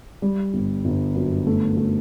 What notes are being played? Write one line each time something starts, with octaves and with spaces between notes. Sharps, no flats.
G3
G1
G1
F#2
A3
A3